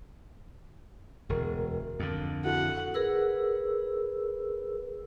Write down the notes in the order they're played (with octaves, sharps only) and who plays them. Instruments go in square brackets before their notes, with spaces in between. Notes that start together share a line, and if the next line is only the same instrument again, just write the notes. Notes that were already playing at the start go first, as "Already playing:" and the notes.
[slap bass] E1 [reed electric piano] D2 A#4
[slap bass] F2 D3
[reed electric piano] E4 F#4 A4 [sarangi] F#5
[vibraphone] G#4 A#4 B4 E6